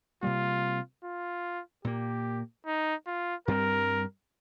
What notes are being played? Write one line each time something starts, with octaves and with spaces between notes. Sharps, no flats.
C3 G3 A#3 F4
F4
A#2 A#3 G4
D#4
F4
G2 G3 C4 A#4